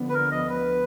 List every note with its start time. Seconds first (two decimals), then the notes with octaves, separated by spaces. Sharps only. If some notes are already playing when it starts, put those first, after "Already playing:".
Already playing: D2 D3 F3 B3
0.09 B4
0.14 A#4
0.31 D#5
0.49 B4